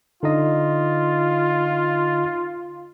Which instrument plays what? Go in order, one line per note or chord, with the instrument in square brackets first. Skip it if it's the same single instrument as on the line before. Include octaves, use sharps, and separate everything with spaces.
[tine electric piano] D3 D#4 D#5 [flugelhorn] F4